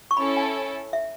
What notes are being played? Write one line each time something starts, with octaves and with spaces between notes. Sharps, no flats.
C#6
C#4 E4 A4 B5
G#5
A5
E5